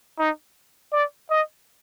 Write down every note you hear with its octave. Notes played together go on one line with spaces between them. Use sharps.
D#4
D5
D#5